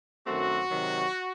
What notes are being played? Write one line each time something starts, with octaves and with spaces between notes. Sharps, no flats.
F#2 D#3 F#3 A3 C4 F#4
C3 D#3 F#3